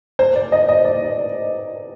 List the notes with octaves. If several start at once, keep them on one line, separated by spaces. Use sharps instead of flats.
C5
D5
D#5
D#5
D5